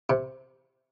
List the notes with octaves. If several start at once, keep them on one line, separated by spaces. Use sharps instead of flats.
C3